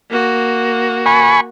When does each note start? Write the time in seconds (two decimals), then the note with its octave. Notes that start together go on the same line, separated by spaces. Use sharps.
0.10 A#3 F#4
1.06 G#5 B5 C#6